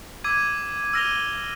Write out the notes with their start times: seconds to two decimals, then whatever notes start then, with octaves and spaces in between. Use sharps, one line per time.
0.24 D6 E6 G#6 D#7
0.93 E6 F6 A#6 D#7 F7 G7